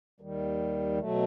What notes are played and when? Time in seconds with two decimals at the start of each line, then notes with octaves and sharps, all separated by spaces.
0.20 D#2 D#3 G3
0.98 B2 F#3 A3